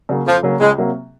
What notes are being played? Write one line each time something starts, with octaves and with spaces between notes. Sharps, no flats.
C#3 F#3 A#3
F2 F3
C#3 F#3 A#3
C#2 G#3
C3 F#3 A#3